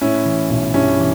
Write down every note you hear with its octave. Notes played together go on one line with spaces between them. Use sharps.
A2 C#4 E4
E3
B1
G2 C#4 E4
E3